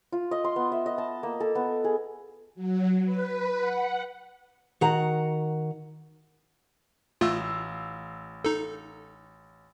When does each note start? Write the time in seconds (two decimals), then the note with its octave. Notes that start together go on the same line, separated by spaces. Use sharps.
0.12 F4
0.31 D#5
0.44 C6
0.56 B3
0.72 E5
0.86 D#5
0.98 A5
1.23 A#3
1.40 A4
1.55 B3
1.84 G#4
2.55 F#3
3.04 B4
3.58 F#5
4.81 D#3 F#4 F#5 A#5
7.21 A1 A3 F4 F5 E6
8.45 D#4 A4